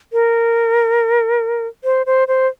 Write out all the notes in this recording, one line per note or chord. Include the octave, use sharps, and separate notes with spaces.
A#4
C5
C5
C5